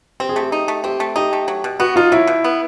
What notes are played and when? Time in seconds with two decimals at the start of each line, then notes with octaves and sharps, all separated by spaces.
0.20 C4 G4
0.29 G#4
0.36 A3 G4
0.52 D#4
0.68 A3
0.84 C4 G4
1.00 A3
1.16 D#4 G4
1.33 A3
1.48 F#3
1.64 B2
1.80 B3 F#4
1.96 D#4 F4
2.12 F#3 E4
2.27 B2
2.44 B3